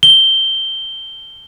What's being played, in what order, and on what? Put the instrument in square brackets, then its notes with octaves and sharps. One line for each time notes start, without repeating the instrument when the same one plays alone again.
[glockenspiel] G7